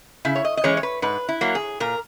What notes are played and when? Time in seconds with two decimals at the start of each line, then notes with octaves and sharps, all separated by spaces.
0.25 C#3 E4
0.35 C#5
0.45 D#5
0.57 D#5
0.64 E3 G#3 C#4 C#5
0.77 C#5
0.83 B4
1.02 G#2 B4
1.29 E4
1.41 F#3 A#3
1.55 G#4
1.80 A#2 A#4